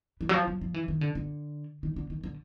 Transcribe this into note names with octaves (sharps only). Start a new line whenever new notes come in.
E3
F#3
F3
F#3
F3
E3
D#3
D3
D3
D#3
D3
D#3
D3